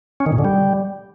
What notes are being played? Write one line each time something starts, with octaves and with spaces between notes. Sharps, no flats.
C#4
D#3
A#2
D3
G3